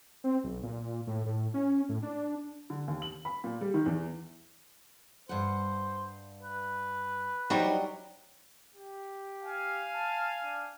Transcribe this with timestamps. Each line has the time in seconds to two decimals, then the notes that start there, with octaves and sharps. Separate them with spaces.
0.24 C4
0.44 B1
0.63 A#2
1.07 A2
1.26 A2
1.54 C#4
1.89 A2
2.03 D4
2.70 D3
2.88 D#2
3.02 F#7
3.25 B5
3.44 A#2
3.61 G3
3.74 D#3
3.86 E2
5.29 G2 C5 F#5
6.43 B4
7.50 F#3 G3 D4 D#4 C5
8.75 G4
9.43 F5 G#5
9.94 A5
10.44 D4